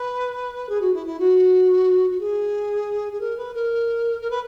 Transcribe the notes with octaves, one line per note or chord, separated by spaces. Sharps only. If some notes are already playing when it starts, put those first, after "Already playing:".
Already playing: B4
G#4
F#4
E4
E4
F#4
F#4
G#4
G#4
A#4
B4
A#4
A#4
B4